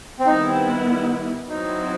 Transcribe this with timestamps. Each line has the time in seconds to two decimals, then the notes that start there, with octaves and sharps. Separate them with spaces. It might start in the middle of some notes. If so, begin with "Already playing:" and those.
0.20 C4
0.26 D#3 G3 B3 D#4 E4
0.48 C4
1.49 F#3 C4 D#4 E4